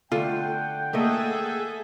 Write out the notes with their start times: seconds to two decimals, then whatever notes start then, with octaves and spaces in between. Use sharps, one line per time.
0.12 D3 A3 F4 F#5 G5
0.93 A3 A#3 G#4 A4 D#5 E5